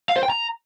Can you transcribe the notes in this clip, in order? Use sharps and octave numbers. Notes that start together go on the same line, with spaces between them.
F5
C5
G5
A#5